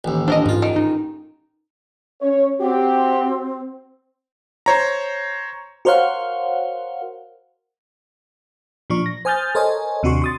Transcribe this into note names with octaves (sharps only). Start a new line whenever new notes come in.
A1 D#2
C4 D4 A#4 D#5
A1 G#2 F4
D#3
D#4
C#4 C#5
C4 F#4 G4
C5 C#5 A#5
F#4 A#4 C5 C#5 F5 F#5
A#2 F3 D4 C#6
A#6
C5 G#5 D#6 F6 G6 A6
A4 A#4 C5 C#5 D#5 G#5
D#2 C3 D4 F#4 C6 C#6
C6 D#6 A6